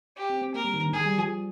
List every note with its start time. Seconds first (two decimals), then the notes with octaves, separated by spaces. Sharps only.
0.17 G4
0.30 C4
0.42 C4
0.54 A#3 A#4
0.65 G3
0.74 D#3
0.83 D3
0.93 D#3 G#4
1.05 G3
1.18 F3